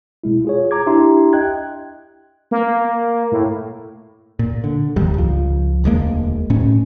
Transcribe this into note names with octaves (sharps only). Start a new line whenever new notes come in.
B2 G#3 E4
F4 G#4 C#5
A#5 D6 G#6
D4 E4 G4 E5 A#5 C6
D#5 G5 F#6 G#6
A#3
A2
A#2
D3
D1 G1 D#2 G3
C#2 F3
E1 D2 G#3 A#3
A2 A3 C#4